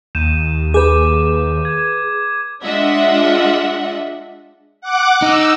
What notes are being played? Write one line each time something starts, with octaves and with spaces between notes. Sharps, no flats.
D#2 G6 D#7 E7
G#4 B4 D6 G6
G#6
G#3 D4 F4 D#5 E5 F#5
F#5 D6
D#4 E6